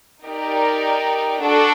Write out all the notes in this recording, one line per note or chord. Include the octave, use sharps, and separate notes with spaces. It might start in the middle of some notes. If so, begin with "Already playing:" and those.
D#4 G4 A#4 D5
D4 F#4 A4